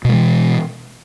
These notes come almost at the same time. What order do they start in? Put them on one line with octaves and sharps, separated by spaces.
B2 G#3 E3